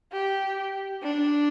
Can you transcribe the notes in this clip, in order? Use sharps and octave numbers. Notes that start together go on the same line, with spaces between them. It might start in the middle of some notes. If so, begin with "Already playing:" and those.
G4
D4